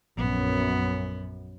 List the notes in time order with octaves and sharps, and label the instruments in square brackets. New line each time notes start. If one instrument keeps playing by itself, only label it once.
[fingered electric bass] A#1 [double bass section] F#2 [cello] B3